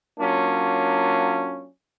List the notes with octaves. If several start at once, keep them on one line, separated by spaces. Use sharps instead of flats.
F#3 A#3 C#4 D4 F4